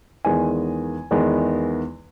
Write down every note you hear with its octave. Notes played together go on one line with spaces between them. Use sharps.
E2 D#3 G#3 B3 G#5
E2 D#3 G#3 B3